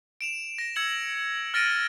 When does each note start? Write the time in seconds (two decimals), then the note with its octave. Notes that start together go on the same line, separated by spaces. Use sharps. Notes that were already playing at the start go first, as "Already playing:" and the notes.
0.21 D7 E7 F7
0.58 A#6 D7
0.76 E6 G#6 C#7 F#7
1.54 F6 A6 A#6 D7 D#7